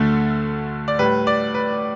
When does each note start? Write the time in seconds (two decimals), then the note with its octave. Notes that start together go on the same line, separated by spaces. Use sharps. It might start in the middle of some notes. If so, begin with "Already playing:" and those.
Already playing: D2 D3 A3 A4
0.88 D5
0.99 A2 G3 B4
1.27 D5
1.54 B4